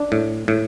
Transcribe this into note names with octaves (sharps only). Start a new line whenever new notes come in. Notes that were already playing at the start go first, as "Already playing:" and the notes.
Already playing: D4
A2
A2